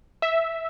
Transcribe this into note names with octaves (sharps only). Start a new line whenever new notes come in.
E5